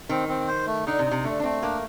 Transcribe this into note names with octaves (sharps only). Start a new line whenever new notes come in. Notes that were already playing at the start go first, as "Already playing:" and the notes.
D#3 C4
C4
C5
A3
D3 D#4
C3
D#4
C3
D3 A3
D4
A3 C4
A#3 D4